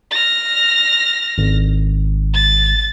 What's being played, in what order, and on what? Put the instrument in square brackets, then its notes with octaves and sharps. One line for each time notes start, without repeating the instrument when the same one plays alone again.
[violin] F6 A#6
[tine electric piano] G#1
[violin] A6